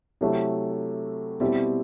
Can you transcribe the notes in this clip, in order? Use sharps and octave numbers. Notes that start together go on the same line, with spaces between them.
C3 F#3 A3 E4
B2 G3 C4 E4